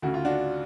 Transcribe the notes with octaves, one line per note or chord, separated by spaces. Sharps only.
D2 C#3 F#4
F4
D4 F#4